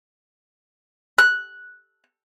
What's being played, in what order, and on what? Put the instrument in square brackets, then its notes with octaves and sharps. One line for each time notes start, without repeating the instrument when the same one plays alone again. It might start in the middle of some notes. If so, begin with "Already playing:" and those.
[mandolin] F#6